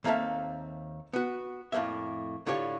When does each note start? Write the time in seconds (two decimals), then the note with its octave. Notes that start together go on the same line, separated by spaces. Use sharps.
0.04 D#2 A#3 C4 A4 E5 F5
1.13 B3 F#4
1.72 F2 A2 F#3 A#3 E5
2.46 A2 D3 F4 G4 C#5